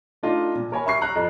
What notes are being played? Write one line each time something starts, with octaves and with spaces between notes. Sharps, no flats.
A3 D4 D#4 F4 D#5
A#2
A#4 C#5 G#5 B5
E5 B5 C#6 C7
A#5 F#6
F2